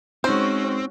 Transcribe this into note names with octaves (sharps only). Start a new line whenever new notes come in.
G#3 C4 C#4 D#4 F#4 C5